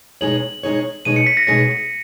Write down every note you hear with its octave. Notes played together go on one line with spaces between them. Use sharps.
B2 G#3 D#4 G#4 C#5 F#7
B2 G#3 D#4 G#4 C#5
B2 G#3 D#4 G#4 C#5 D#7
C#7
B6
A#6
B2 G#3 D#4 G#4 C#5 A#6